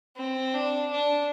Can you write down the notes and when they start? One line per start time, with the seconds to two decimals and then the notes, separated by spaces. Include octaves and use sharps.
0.16 C4
0.54 D4
0.91 D4